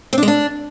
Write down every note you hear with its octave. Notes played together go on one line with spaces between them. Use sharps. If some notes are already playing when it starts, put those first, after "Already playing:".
C4
D4
G#3
D4